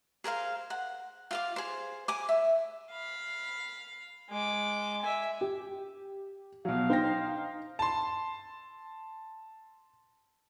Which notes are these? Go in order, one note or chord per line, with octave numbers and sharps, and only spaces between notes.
G#4 A#4 C5 F5
F#5
F4 F5 D6
G#4 C5
G#5 D6
E5
F5 B5
G#3 D6
E5 G#5
G4
B2 F#3 F5
D#4 C5 G5 A#6
A5 C6